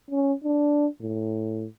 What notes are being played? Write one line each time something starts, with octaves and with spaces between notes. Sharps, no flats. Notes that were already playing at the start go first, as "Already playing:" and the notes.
C#4
D4
A2